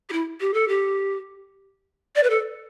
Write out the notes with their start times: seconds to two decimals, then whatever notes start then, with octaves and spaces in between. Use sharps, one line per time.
0.10 G4
0.13 E4
0.41 G4
0.54 A4
0.69 G4
2.16 D5
2.23 B4
2.30 A4